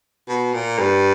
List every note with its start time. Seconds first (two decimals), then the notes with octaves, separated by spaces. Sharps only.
0.28 B2
0.54 A#2
0.78 G2